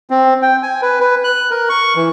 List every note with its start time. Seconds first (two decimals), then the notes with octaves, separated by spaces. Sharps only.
0.10 C4
0.42 G5
0.62 G#5
0.82 B4
1.00 B4
1.24 F#6
1.51 A#4
1.69 C#6
1.95 E3